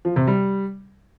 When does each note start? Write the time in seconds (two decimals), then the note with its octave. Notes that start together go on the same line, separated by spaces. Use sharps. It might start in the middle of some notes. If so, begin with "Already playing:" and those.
0.05 F3
0.16 C3
0.27 G3